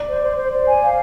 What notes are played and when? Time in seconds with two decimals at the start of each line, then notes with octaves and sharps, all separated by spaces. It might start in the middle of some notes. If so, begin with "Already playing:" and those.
Already playing: D5
0.08 C5
0.23 C5
0.37 C5
0.52 C5
0.67 G#5
0.82 F5